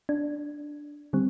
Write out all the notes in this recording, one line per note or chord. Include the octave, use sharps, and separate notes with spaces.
D4
D3 G3 C4